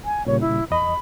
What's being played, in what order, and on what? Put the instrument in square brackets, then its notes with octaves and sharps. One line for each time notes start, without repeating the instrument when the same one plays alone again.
[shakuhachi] G#5
[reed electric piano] A#2 C#3 G3 [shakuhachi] C#5
[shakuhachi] E4
[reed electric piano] E2 D#5 [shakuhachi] B5